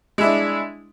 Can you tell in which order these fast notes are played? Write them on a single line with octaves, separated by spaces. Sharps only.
G#3 E4 D4